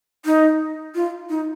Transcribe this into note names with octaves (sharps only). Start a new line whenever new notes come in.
D#4
F4
D#4